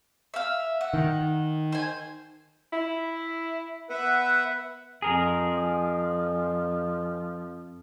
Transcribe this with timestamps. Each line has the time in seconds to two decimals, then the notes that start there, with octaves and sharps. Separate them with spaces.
0.34 E5 F5
0.81 F#5
0.94 D#3
1.72 C5 G#5
2.73 E4
3.90 B3 B4 E5 F#5
5.02 F2 F3 G#4 A#4